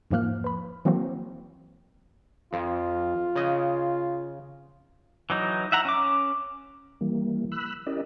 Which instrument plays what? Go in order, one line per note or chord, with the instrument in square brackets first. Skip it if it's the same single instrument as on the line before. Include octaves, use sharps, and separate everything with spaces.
[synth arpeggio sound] E2 G#2 F3 A#3 F6 F#6
B4 B5
E3 F#3 A#3 C4 F#4 C5
[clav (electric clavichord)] F2 [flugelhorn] F4
[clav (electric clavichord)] C#3 D#5
[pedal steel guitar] E3 F#3 D#4
E5 F#5 A#5
C#4 D6
[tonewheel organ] E3 G3 A#3
B5 E6 F#6
C#4 E4 G4 A#4 D5 D#5